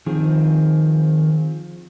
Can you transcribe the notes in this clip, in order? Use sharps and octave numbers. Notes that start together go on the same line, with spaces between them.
D#3 F3 C4 G#4